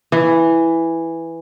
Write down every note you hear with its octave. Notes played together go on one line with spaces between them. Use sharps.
E3